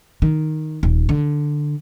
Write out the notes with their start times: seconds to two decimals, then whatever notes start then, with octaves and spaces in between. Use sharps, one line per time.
0.22 D#3
0.83 D#1
1.09 D3